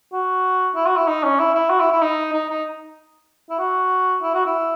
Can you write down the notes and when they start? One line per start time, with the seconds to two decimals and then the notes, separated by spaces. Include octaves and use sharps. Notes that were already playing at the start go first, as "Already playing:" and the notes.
0.13 F#4
0.75 E4
0.86 F#4
0.96 E4
1.07 D#4
1.23 C#4
1.39 E4
1.55 E4
1.70 F#4
1.80 E4
1.91 E4
2.01 D#4
2.33 D#4
2.49 D#4
3.50 E4
3.59 F#4
4.22 E4
4.34 F#4
4.46 E4